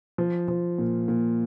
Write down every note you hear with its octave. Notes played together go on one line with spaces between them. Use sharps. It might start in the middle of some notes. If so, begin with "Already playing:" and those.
F3
F3
A#2
A#2